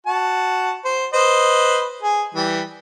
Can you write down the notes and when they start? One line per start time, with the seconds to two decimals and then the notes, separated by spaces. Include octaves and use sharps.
0.07 F#4 A5
0.85 C5
1.13 B4 C5 D#5
2.02 G#4
2.35 E3 G3